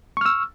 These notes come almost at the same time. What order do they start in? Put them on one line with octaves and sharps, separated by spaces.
C#6 F6 E6